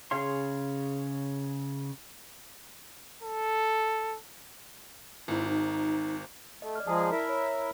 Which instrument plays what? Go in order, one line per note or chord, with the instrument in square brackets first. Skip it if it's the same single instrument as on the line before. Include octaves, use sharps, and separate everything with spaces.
[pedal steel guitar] C#3 G#4 C#5 F5 C6
[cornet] A4
[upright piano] G#1 G#2 [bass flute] E4
[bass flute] D#4
[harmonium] A3 [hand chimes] D#5
[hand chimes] D5 F6
[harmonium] F3 G#3 G#4 [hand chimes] A5 A#5
[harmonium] E4 A#4 E5
[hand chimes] C#5